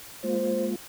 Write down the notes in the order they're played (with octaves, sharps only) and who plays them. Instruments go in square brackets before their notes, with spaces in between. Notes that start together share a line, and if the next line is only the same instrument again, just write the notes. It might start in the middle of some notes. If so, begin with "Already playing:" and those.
[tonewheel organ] G#3 A#3 F4 [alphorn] C5